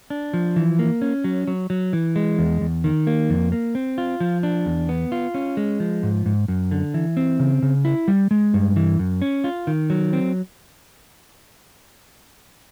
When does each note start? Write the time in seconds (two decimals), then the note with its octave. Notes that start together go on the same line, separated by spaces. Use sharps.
0.10 D4
0.34 F3
0.56 E3
0.79 A#3
1.02 C#4
1.24 F#3
1.48 F#3
1.70 F#3
1.93 E3
2.16 G#3
2.38 E2
2.61 E2
2.84 D#3
3.07 A#3
3.30 F2
3.52 A#3
3.75 C4
3.98 F4
4.20 F3
4.43 D4
4.66 E2
4.89 B3
5.12 F4
5.35 C#4
5.57 G#3
5.80 F3
6.03 G#2
6.26 G#2
6.48 F#2
6.71 D3
6.94 E3
7.17 C4
7.39 C#3
7.62 C#3
7.85 E4
8.08 G3
8.31 G#3
8.54 G2
8.76 E3
8.99 F#2
9.22 C#4
9.44 F4
9.67 D#3
9.90 F#3
10.13 C4